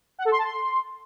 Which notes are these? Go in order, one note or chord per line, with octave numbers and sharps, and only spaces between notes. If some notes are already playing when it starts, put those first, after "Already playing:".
F#5
A4
C6
A5
C6